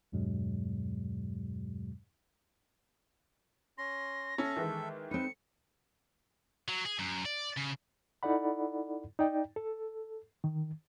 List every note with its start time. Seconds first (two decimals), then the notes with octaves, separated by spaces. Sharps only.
0.12 E2 G2 B2 F#3 G#3
3.78 C#4 C6 A#6
4.38 C#4 A4 E5
4.56 D#3 E3 G#3
5.11 C4 D#4 B4 C#7
6.69 F#3
6.86 G#4
6.99 F#2
7.25 D5
7.57 C#3
8.23 D#4 E4 A4 D5 F#5 B5
9.19 D#4 D5 G5
9.56 A4
10.44 D#3